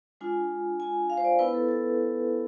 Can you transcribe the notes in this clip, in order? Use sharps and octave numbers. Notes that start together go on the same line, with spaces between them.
G#3 D4 F4 G#5
G#5
F5
C5
D5
B3 E4 B4
A4
A4